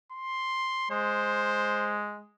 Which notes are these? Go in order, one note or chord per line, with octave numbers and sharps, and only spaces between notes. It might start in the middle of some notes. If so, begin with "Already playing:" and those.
C6
G#3 C5